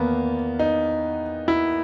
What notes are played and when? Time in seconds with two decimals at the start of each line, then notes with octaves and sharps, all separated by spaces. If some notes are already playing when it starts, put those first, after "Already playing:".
Already playing: E2 D#3 A#3 B3
0.59 D#4
1.48 E4